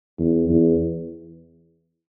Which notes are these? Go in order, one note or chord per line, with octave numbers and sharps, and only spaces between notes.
E2
E2